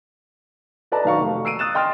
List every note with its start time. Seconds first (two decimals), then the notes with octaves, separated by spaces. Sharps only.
0.92 A4 B4 D5 D#5 A5 A#5
1.05 B1 D#3 F#4 F5 A#5 C#6
1.20 F1
1.45 E6 C7 D7 D#7
1.59 D#6 F#6 A6 E7
1.74 D#5 G5 C6 F6 A6